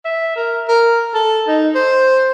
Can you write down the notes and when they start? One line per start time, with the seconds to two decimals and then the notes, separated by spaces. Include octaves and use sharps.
0.05 E5
0.36 A#4
0.68 A#4
1.14 A4
1.48 D#4
1.75 C5